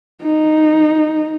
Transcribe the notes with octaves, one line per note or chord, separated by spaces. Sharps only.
D#4